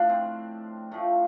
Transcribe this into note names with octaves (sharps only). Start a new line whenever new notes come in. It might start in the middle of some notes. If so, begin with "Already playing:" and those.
Already playing: A2 F3 D4 F4
C4
A2 F3 A3